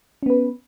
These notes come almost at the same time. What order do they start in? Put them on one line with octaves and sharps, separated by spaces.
C#4 B3 B4